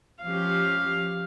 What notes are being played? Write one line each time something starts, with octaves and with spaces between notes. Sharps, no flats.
F3 C#4 G4 F5